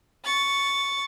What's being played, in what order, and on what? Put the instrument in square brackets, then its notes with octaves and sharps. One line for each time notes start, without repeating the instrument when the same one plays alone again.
[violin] C#6 A6